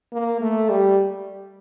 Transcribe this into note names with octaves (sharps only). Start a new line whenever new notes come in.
A#3
A3
G3